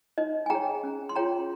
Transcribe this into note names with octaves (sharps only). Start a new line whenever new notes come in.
D#4 D#5
G#5
G#4 C#5 G5 A#5
C#4
C6
F4 G#4 C#5 G5 A#5